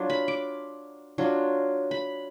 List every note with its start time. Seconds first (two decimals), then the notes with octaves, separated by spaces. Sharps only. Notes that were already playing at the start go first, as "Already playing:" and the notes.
Already playing: F#3 D4 F4
0.10 B5
0.28 D6
1.18 F#3 D4 F4
1.91 B5